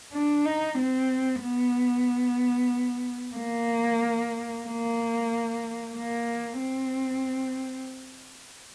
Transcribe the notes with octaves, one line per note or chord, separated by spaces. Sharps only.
D4
D#4
C4
B3
A#3
A#3
A#3
C4